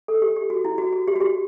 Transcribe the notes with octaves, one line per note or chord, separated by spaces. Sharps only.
A4
G4
G4
F#4
E4
F#4
F#4
G4
F#4
G4